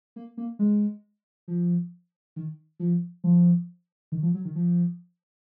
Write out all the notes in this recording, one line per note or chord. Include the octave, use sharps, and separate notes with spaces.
A#3
A#3
G#3
F3
D#3
F3
F3
D#3
F3
F#3
D#3
F3